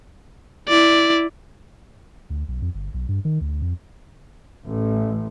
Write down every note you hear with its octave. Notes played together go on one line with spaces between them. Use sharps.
E4 D5
D2
B1
F2
G1
B1
G2
D#3
D2
F2
A1